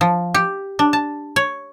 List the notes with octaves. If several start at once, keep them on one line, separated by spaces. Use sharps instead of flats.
F3
G4
D4
A5
C#5